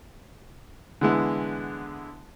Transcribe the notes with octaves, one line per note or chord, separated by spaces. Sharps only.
D3 E3 G#3 B3 E4